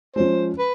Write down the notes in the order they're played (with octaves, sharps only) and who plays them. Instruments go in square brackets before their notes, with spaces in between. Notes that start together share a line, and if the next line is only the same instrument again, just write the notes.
[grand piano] F3 G#3 C#4 [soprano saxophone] C5
[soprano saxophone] B4